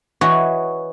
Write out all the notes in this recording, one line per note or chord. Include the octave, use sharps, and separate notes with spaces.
E3 F#4 C#5 D#5